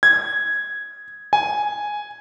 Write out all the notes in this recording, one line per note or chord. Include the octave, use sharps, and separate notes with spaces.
G#6
G#5